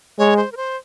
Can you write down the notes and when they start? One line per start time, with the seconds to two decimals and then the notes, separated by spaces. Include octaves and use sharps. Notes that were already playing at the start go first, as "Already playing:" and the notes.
0.18 G#3 C#5
0.37 C5
0.52 A#4
0.57 C5